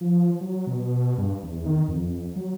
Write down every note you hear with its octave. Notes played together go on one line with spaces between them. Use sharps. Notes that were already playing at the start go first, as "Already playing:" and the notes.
F3
F#3
B2
G2
E2
D#3
F2
F2
F#3